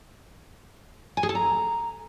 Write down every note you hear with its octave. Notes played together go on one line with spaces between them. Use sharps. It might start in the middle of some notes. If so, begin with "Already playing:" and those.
G#5
G#4
A4
A#5